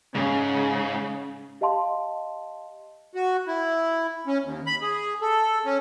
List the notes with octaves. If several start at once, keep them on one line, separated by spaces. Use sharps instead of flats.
G#2 C#3
G4 D#5 F5 A5 C6
F#4
E4
C#4
D#2
B5
G#4
A4
C#4